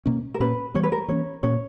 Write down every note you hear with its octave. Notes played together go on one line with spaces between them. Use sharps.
B2 A#3 C#4
A#4
A#2 A#3 C#4 B4
E3 G3 B3 C#5
B4
A#4
E3 A#3 C#4 C#5
A#2 A#3 C#4 C#5